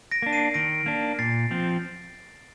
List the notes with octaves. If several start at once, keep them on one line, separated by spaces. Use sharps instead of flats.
A#6 D7
A#3 D4
C7 D#7
D#3 A#6 D7
A#3 D4
A#2 A6 C7
F3 C4